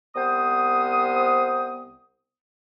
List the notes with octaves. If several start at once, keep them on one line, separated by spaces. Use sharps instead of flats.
C2 B3 C5 D#6